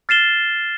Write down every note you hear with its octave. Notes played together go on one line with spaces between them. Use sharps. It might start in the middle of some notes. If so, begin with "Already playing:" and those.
F6 A6 C7 E7 G7